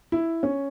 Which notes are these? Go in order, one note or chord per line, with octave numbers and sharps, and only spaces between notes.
E4
C#4